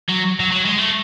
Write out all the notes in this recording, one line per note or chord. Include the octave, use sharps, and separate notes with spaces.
F#3
F#3
F#3
G#3
A3